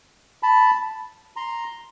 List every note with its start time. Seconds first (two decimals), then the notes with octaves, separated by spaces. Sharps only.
0.43 A5 B5
1.36 A#5 C6